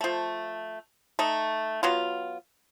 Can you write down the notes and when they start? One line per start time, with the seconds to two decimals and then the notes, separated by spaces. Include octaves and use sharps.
0.01 F3 A3
1.19 A3 D#4
1.83 F#3 B3 F4